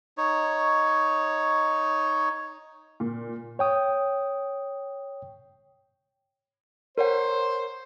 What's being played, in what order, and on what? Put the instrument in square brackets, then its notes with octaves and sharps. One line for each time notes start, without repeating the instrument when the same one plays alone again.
[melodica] D#4 C#5
[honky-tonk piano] A#2
[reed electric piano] C#5 G5 D#6
[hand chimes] A#4 C#5 F#5 [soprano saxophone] C5